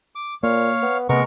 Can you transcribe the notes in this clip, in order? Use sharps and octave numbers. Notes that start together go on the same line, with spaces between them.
D6
A#2 A#3 C#5 F5
B3
C3 G#3 A#3 B3 A#4 C#6